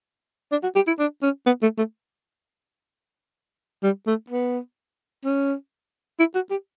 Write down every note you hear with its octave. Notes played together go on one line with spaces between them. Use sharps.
D4
F#4
G4
E4
D4
C#4
B3
A3
A3
G3
A3
B3
C#4
E4
F#4
G4